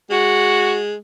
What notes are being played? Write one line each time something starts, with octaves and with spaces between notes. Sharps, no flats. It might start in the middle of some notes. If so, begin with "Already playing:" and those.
G#3 F#4